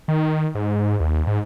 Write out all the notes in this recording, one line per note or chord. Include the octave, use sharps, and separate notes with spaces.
D#3
G#2
D#2
G#2